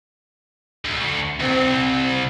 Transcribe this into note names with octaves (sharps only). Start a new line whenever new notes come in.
D2
C2 C4